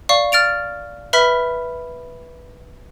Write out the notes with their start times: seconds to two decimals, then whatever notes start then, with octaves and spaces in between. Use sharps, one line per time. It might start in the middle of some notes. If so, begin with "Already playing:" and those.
0.09 D5 F5 C#6
0.32 F6 A6 D7 F7
1.13 B4 E5 B5 F6 B6